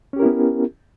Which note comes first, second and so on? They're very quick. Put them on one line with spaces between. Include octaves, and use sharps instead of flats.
C#4 G4 A#4 E4 B3